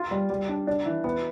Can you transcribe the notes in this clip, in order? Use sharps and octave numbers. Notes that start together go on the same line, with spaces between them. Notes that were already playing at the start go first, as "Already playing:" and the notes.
Already playing: F4
G3
G3
D4
D4
E3
B3